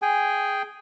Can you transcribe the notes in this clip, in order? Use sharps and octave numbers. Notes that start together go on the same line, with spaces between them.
G#4 G5 G#5